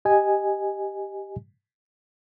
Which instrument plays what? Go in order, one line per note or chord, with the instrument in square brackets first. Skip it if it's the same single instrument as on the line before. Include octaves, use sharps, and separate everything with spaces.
[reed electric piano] G4 D#5 G#5